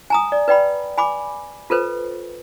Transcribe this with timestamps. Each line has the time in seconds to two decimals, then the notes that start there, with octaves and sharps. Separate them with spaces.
0.10 G#5 A#5 D#6
0.32 D5
0.48 B4 D5 G5 B5
0.98 G#5 B5 D6
1.70 F4 A4 B4 C5